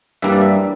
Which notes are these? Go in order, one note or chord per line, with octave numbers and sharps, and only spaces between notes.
G2 E3 G3 A#3 D4 E5
D5
E5